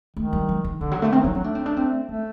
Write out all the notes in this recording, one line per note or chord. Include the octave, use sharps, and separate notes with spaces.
D#3 A3
G3
F#3
D#3
D3 D#3
F#3
D3 A3
D#3 C4
F#3 D#4
F#3 D#4
A3 D4
C4
D4
C4
A3 A#3